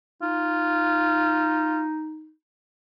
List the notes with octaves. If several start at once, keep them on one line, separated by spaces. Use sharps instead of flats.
D#4 F4